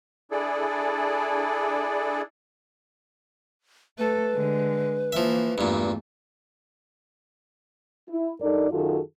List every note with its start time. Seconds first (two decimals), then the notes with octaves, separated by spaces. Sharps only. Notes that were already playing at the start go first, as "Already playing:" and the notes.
0.31 D4 E4 G#4 A4 D5
3.98 A3 A4 B4
4.32 D3 G#3
5.12 E3 F3 A#3 E5
5.58 E2 G2 A#2 A3
8.09 E4
8.41 G2 D#4 A4 A#4 D5
8.71 F#2 D#3 F4 F#4 G#4 A4